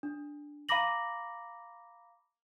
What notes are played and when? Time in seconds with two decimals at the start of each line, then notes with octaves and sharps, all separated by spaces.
0.03 D4
0.69 F5 A#5 B5 D6 A#6 F#7